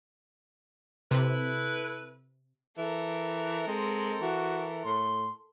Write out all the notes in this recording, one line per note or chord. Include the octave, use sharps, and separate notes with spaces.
C3 E4 A4 B4
E3 A4 A#4
G#3 C4
E3 F#4
A2 C6